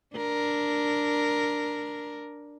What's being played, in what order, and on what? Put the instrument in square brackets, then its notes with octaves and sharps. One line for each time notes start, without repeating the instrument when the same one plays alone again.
[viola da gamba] D4 A#4